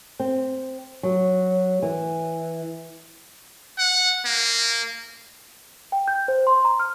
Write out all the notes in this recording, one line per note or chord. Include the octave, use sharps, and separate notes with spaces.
C4
F#3
E3
F#5
A#3
G5
G6
C5
C6
A#5
F6